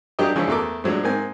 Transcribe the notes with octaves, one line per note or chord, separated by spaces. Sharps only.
F#3 D4 G4 A#4 D#5
C#3 E3 F3 G#3 C#4 D4
E2 A3 A4 A#4 D6
A2 F#3 G#3 D4
G#2 A#3 C4 G#5